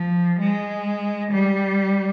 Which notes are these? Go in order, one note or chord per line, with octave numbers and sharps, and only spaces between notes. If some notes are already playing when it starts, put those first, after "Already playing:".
Already playing: F3
G#3
G3